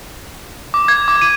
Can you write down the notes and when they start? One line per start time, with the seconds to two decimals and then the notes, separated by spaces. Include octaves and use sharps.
0.74 D6
0.88 G#6
1.08 D6
1.21 D#7